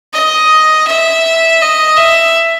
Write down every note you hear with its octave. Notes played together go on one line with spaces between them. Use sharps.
D#5
E5
D#5
E5